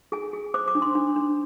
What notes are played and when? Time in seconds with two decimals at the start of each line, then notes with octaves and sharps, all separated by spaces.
0.12 G#4 G#5
0.33 G#4
0.54 C5 D6
0.68 D6
0.75 D4
0.82 C6
0.95 D4
1.16 D4